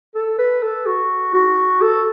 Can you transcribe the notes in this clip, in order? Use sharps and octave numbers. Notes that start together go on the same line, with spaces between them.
A4
B4
A4
F#4
F#4
A4